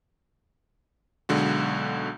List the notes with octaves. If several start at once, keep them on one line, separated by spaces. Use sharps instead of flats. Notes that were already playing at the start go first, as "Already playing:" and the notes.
B1 D3 G#3 F#4